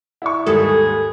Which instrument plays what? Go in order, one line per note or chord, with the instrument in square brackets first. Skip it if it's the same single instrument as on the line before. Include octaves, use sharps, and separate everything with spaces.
[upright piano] E4 D5 C#6
[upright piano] D#2 G#2 G3 [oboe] G#4 [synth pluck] A4